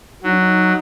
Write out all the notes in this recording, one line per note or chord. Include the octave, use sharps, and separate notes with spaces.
F#3 D#4
D4
D#4